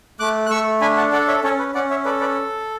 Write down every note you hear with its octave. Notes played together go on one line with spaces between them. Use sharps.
A3 D6 F#6
F#6
A3 C#6 E6
D4 G#5 B5
F#5 A5
A4 D5 F#5
C#5 E5
C#4 A4 C#5
B4
C#4 D5 F#5
C#5 E5
A4 B4 D5
B4 D5